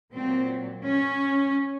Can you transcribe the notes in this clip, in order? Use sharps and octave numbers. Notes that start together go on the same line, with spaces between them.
A#2 F#3 C4
C#4